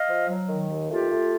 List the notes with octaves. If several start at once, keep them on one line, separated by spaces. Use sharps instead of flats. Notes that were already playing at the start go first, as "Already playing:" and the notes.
Already playing: D#5 F5
F3
F#3
D#3
D#2
A3 F4 G4
A3